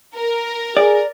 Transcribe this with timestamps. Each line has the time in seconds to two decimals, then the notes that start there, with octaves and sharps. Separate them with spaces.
0.16 A#4
0.77 G#4 D5